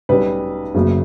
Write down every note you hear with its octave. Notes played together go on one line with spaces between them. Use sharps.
B1 B2 G3 C#4 B4
F#1 F#2 C#3 F#3 A#3